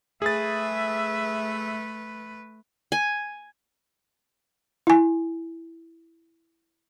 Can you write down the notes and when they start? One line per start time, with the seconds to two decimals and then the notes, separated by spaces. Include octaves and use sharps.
0.22 A3 G#4 B4 E5 A6
2.92 G#5
4.87 E4 G#5